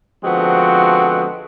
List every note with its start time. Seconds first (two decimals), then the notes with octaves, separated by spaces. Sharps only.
0.24 D3 F3 G#3 B3 C4 F#4